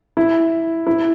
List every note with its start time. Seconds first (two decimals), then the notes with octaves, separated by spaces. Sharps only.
0.17 E4
0.87 E4